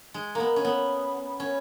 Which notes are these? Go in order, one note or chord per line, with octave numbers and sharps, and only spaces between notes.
G#3
A#3 B3
C#4
B3
C#4